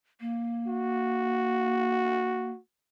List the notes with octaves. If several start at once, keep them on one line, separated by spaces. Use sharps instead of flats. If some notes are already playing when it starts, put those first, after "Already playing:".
A#3
F#4